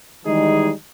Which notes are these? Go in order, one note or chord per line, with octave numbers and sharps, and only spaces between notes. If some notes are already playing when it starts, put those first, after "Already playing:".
D#3 E3 G3 G#3 D#4 G#4